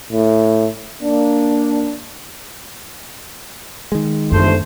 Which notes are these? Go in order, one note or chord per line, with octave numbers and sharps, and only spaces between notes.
A2
A#3 D4
D#3 G#3
G1 F#2 A3 A#3 C5